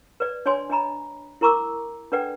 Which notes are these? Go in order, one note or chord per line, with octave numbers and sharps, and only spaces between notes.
B4 D5
D4 C#5 D5 G#5 C6
D4 D#5 G#5 A#5 B5
E4 A#4 A#5 C#6 D6 E6
D4 A4 B4 D5 F#5 G5